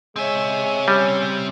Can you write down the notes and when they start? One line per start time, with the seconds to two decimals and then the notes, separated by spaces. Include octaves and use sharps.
0.16 G#3 C4 C#5 E5 G#5
0.88 G3 C#4